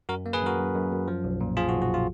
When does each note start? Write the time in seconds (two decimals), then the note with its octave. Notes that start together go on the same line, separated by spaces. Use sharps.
0.09 F#2 F#4 A#4
0.26 A#3
0.33 G#4 B4
0.42 F#2 F#4 A#4
0.59 F#2
0.75 F#2
0.92 F#2
1.08 F3
1.24 B1
1.41 A#2
1.57 F3 F4 G#4
1.69 F#4
1.73 B1
1.82 F#4
1.94 F4